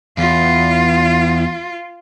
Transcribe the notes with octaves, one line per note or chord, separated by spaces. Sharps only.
E2 F4